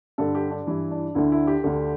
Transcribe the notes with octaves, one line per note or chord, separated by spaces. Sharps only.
G2 D3 A4
G4
D4
G2 E3 E4
D4
D2 D3 E4
E4
G4
D2 D3